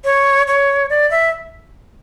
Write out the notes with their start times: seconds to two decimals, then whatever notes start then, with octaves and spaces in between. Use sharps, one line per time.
0.04 C#5
0.48 C#5
0.90 D5
1.11 E5